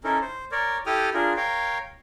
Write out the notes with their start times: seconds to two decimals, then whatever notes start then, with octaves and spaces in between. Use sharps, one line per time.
0.04 C#4 D#4 E4 A4 A#4
0.21 C5
0.52 A#4 C#5 D5
0.86 E4 G4 A4 G5 D#6 F6
1.14 D4 F4 G#4 A#4
1.37 A#4 C#5 F5 G5